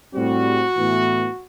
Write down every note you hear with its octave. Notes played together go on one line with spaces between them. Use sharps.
A2 G3 C4 F#4
A2 E3 B3